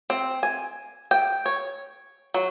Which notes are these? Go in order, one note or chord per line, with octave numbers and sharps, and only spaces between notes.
C4
G#5
G5
C#5
F#3